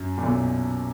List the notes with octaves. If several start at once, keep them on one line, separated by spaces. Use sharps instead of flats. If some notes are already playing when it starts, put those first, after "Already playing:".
Already playing: F#2
A#2
B1 B2